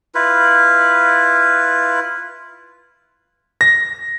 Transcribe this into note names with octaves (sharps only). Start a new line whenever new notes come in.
E4 F4 B4
A#6